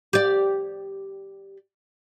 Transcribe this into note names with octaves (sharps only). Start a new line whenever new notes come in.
G4 D5